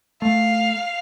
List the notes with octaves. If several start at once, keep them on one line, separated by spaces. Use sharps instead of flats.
A3 F5